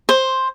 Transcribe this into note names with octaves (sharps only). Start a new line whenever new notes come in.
C5